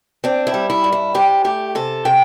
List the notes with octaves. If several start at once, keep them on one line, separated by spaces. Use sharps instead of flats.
C4 D4
E4
G3
E4
G2
E4
C3 G4
A3 G4
C3 A4
C3 G5